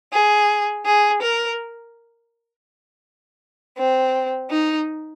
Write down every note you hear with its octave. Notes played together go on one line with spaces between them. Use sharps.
G#4
G#4
A#4
C4
D#4